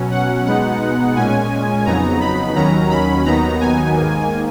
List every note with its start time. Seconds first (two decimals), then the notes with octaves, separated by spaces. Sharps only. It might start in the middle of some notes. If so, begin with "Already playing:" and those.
Already playing: B2 F#3 C#4
0.11 F#5
0.46 B2 G#3 B3 D#4 F#5
1.16 A#2 G#3 C#4 G#5
1.86 F2 C#3 F#3 B3 D#4 A#5
2.21 B5
2.56 D#2 D#3 F#3 C#4 A#5
2.90 B5
3.25 D#2 D#3 F#3 B3 D#4 A#5
3.61 G#5
3.96 G#2 D#3 A#3